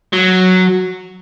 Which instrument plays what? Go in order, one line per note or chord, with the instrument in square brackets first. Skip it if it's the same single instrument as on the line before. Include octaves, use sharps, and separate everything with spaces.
[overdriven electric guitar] F#3